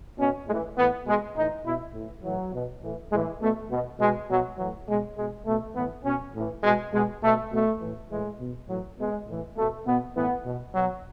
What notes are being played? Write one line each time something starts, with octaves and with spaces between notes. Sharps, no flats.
B2 C#4
A2 E3 G#3
A2 E3 B3
B2 G#3
A2 E3 D#4
B2 E4
A2 E3
A2 E3 F#3
B2
A2 E3
A2 E3 G#3
B2 A3
B2
B2 G#3
B2 F#3
A2 E3 F#3
B2 G#3
B2 G#3
B2 A3
A2 E3 B3
B2 C#4
A2 E3
B2 G#3
B2 G#3
B2 A3
B2 A3
A2 E3
A2 E3 G#3
B2
A2 E3 F#3
B2 G#3
A2 E3
B2 A3
B2 B3
A2 E3 B3
B2
B2 F#3